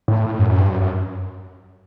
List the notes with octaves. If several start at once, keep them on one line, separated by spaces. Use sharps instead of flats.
A2
F#2
F#2
G2
F#2
F#2